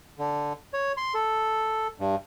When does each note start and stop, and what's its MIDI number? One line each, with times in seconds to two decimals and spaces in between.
0.19 0.53 50
0.73 0.92 73
0.97 1.14 84
1.14 1.87 69
2.00 2.15 43